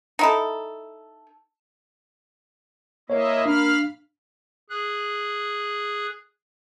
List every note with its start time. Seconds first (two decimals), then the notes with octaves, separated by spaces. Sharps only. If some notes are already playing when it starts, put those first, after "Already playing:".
0.19 D#4 E4 A4
3.10 A#3 E4 C#5 D#5 E5
3.45 D4 F5 B5 F6
4.70 G#4 F#6